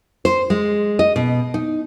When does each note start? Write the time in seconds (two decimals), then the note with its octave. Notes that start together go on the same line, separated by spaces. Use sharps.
0.25 C5
0.50 G#3
0.99 D#5
1.16 B2
1.54 D#4